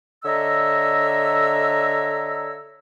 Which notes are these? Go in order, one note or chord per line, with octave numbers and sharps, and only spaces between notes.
D3 C#5 D#5 E5 A#5 E6